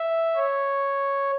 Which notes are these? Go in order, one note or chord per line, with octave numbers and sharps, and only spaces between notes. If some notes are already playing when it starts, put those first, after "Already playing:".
Already playing: E5
C#5